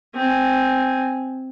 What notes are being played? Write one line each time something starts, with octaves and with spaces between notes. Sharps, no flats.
C4 G#5